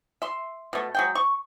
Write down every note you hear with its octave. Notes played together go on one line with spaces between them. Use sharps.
E5 C6
B2 A3
F#3 G#3 G5
C#6